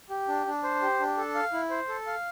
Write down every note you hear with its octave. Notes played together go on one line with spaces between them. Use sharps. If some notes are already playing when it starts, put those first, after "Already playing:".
G4
D4
D4
C5
G4
D4
A4
F5
E4
C5
A4
F5